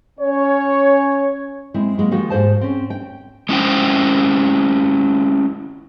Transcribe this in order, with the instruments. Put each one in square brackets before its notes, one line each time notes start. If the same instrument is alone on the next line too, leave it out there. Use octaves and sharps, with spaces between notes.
[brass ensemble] C#4 C#5
[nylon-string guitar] G#3 C4 E4
F#3 G#3 A#3
D#3 F3 G#3 F#4
G#2 G#4 C5 A5
C4 C#4
G5
[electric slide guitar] G#3 C#4 E4 C5 G5